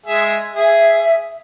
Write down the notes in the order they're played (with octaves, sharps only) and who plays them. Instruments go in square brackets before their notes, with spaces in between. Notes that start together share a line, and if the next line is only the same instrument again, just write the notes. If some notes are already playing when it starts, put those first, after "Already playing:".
[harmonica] G#3 G#4 E5
[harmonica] G#4 [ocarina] E5